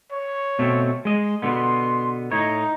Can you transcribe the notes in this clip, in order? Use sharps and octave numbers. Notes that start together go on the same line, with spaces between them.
C#5
B2 A3 C4
G#3 D#5
B2 D3 B3 C6
A2 D#4 C#5